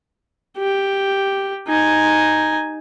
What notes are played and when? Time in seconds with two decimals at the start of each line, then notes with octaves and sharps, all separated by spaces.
0.58 G4
1.68 D#4 G#5